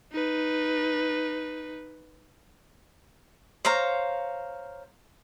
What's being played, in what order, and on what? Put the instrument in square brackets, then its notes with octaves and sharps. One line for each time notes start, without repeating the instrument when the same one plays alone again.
[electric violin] D#4 B4
[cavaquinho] C5 C#5 F5 A#5